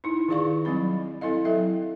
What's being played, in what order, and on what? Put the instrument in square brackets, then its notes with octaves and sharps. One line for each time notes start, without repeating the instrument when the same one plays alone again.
[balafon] D#4 E4
D#3 F4 G#4 D5 F5 C#6
F#3 G3 C4 B5
C4 E4 A4 D#5 F5
F#3 A4 E5 G5